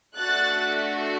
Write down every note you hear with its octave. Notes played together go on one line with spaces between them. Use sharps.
A3 D4 F#4 F#6 A6